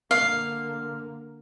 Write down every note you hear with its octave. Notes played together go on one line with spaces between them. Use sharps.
D3 A#3 F5